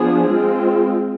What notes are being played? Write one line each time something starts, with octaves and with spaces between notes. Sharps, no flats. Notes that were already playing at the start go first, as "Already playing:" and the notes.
Already playing: F3 B3 D4 G#4
G#3 C4 F4